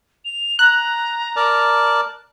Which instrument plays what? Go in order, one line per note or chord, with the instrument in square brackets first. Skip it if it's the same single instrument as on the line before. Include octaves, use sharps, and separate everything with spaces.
[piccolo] F7
[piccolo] A#5 [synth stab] F#6
[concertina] A#4 D5 A5